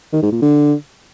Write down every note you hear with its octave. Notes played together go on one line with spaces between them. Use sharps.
D#3
G#2
A#2
D3